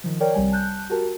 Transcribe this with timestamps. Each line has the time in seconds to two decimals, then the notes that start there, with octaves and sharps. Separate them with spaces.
0.04 D#3 F3
0.20 A#4 C#5 D5 G5
0.34 C2 G3 G#5
0.52 A5 F#6 G6
0.90 F#4 G4 A#4 A5